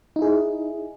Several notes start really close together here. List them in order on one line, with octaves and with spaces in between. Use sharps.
D#4 E4 G#4